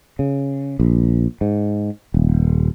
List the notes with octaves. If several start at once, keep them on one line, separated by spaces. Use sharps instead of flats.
C#3
A#1
G#2
D#1